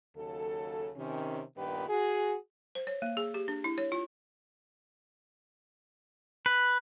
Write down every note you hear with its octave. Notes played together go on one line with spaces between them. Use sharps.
D#2 C#3 F#3 A4
C3 D#3 C#4
G2 A#2 D#3 B3 G4 B4
F#4 G#4
C5
C#5
A#3
G#4
G4
D4
E4
C#5
F4
B4